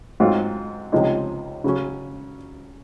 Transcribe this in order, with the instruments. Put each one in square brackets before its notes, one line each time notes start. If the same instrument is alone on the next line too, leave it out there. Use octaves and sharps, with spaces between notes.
[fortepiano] G#2 F#3 C4 F4
C#2 C3 F3 G#3 D#4
C#3 F#3 C#4